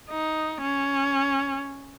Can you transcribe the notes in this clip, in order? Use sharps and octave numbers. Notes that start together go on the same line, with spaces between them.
D#4
C#4